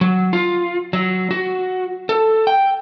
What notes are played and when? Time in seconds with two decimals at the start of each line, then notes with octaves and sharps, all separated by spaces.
0.01 F#3
0.33 F4
0.93 F#3
1.31 F#4
2.09 A4
2.47 G5